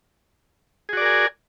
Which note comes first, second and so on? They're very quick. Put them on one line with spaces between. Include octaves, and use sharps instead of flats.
G#4 F#4 D5 A#4 G#5